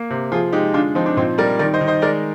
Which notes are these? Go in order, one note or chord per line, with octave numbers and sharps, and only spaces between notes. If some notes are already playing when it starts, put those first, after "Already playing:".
Already playing: A#3
C3
F3 F4 G#4
G#3 D#4 G4
D3 D4 F4
F3 C4 D#4
D4
A#2 C4 D#4
G3 A#4 D5
D#3 A#4 D5
C5 D#5
D#3
C5 D#5
G#3 A#4 D5